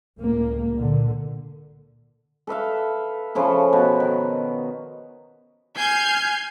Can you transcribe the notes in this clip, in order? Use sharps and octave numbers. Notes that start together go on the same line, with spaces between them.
C#2 A2 A#3
A#2 D3
A4 B4 E5 F5
C#3 F3 E4 A4
B2
D#3
G#5 F6 G6 G#6 C7